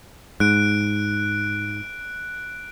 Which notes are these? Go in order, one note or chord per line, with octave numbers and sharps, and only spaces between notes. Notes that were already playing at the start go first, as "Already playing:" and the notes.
G#2 F#6 D7